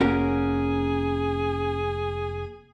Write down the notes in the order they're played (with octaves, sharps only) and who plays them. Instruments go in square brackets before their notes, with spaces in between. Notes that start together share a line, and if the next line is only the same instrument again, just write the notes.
[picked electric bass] F1 A#3 [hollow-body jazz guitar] C#4 F#4 A#4 [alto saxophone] G#4